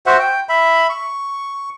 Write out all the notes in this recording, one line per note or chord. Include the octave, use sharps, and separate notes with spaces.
F#4 C5 E5 F#5
G5
E5 B5
C#6